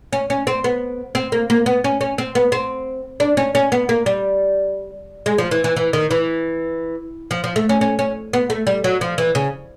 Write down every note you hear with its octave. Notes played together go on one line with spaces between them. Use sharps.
C#4
C#4
C4
B3
C4
A#3
A#3
B3
C#4
C#4
C4
B3
C4
D4
C#4
C#4
B3
A#3
G3
G#3
F3
E3
E3
E3
D#3
E3
F3
F3
A3
C#4
C#4
C#4
B3
A3
G3
F#3
F3
E3
C#3